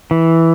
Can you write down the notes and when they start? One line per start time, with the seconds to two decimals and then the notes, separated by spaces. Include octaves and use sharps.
0.11 E3